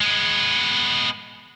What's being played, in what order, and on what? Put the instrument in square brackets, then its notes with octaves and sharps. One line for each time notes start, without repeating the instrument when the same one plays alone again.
[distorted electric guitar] G#3 B3